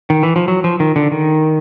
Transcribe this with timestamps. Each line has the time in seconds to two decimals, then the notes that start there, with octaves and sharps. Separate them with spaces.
0.10 D#3
0.23 E3
0.36 F3
0.48 F#3
0.64 F3
0.80 D#3
0.96 D3
1.12 D#3